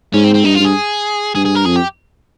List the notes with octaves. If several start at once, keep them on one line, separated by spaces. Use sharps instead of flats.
G#2 C#4
C4
C4
G2 D#4
F4
G2 G#4
G2 G#4
G#4
A#4
F2 G#4
G4